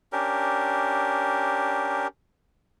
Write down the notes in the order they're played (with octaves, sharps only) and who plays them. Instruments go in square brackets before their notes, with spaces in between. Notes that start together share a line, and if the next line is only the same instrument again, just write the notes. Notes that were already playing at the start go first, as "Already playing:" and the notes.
[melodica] C#4 D4 G4 A#4